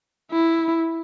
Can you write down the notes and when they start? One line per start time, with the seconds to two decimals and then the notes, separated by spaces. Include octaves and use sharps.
0.32 E4